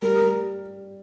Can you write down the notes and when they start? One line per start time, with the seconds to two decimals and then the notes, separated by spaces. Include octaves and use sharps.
0.02 G3 A#4
0.21 G3